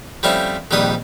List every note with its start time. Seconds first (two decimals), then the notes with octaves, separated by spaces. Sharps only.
0.23 F3 G3 A3 C4 C#4 E4
0.71 A#1 F2 D#3 G3 B4 D#6